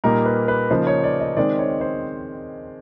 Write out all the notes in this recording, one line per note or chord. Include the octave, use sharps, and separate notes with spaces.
A#2 G3 A#3 D#4 A#4
B4
B4
C#3 F3 A#3 D#4 C5
C#5
D5
D#5
D#3 G#3 C4 D5
C#5
C5